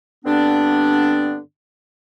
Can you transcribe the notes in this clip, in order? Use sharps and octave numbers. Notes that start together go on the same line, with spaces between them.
G2 D3 B3 C4 D4